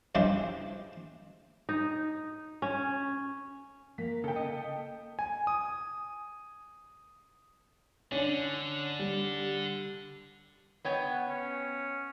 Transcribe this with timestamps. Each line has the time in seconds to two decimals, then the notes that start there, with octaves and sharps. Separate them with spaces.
0.15 G2 C#3 F3 G#3 E4 G4
1.69 D#4
2.62 C#4
3.98 A#3 B6
4.24 C#3 A4 G5
4.36 D#5
5.19 G#5
5.47 D#6
8.12 D3 C#4 D4
8.99 G3
10.85 B3 C#5 G5
11.10 F#5
11.28 C#4